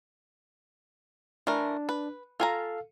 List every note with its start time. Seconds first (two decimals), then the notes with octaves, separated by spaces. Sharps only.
1.47 E3 A3 D4 A#4
1.89 B4
2.40 F4 A4 F5 G#5 A#5